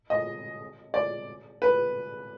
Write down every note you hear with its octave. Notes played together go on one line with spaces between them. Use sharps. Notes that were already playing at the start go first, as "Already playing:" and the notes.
D#5
D5
B4